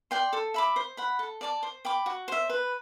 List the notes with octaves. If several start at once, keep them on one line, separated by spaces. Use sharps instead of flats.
D5 G5 C6
A4
E5 B5 D6
C5
F#5 B5
A4
D5 A5 D6
C5
G5 B5 D6
F#4
C5 E5
B4